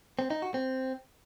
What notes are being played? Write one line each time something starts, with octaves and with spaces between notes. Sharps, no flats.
C4
D#4
F#4
C4